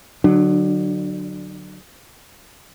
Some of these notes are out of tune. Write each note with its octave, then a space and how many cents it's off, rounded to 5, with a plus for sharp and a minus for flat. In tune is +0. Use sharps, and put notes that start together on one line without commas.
D3 +0 F#3 +0 D4 +35